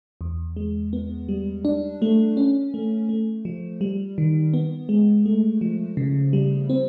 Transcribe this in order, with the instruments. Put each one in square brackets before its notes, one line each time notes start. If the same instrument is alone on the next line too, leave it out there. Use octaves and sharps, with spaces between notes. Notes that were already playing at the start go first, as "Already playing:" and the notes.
[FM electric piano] E2
G#3
B3
G3
D4
A3
C#4
A3
A3
F3
G3
D#3
B3
G#3
A3
F3
C#3
G3
C4